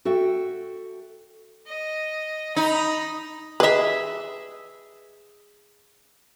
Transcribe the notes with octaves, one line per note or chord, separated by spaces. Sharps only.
F#4 A4 E5 G5
D#5
D#4 A#5 B5
G#4 B4 D#5 E5